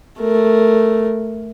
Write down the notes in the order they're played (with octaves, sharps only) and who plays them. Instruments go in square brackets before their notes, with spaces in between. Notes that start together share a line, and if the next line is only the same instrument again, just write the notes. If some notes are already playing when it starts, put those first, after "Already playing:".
[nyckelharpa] A3 A#4